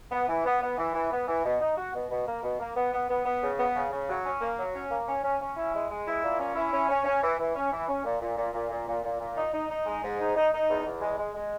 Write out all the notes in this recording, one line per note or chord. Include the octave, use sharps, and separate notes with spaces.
B3
E3
B3
B3
E3
E3
B3
E3
B2
D#4
F#4
B2
B2
A#3
B2
A#3
B3
B3
B3
B3
C#3
B3
C#3
C#3
F#3
C#4
A#3
F#3
C#4
A#3
C#4
C#4
C#4
E4
G#3
G#3
E4
A#2
C#4
E4
C#4
C#4
C#4
E3
E3
C#4
E3
C#4
A#2
A#2
A#2
A#2
A#2
A#2
A#2
A#2
D#4
D#4
D#4
G#3
G#2
D#4
D#4
D#4
E2
E2
G#3
G#3
G#3